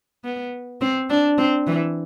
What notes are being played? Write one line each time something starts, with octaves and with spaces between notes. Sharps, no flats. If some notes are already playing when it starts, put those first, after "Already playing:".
B3
C4
D4
C4
E3